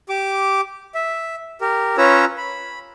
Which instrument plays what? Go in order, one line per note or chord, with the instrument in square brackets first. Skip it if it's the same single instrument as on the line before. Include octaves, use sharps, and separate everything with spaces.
[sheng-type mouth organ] G4 D6
E5
G4 A#4
C#4 F4 B4 C#5 A#5 E6
B5